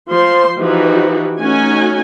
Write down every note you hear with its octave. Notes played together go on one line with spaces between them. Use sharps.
F3 C5 C6
E3 F3 D#4 F#4 G4 B4
A3 C#4 D#4 F#4 G#5